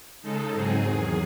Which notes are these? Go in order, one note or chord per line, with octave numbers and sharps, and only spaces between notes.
C#3 G#3 D#4 A4
G#2 F#3 C4 D#4 G#4
E2 D#3 F#3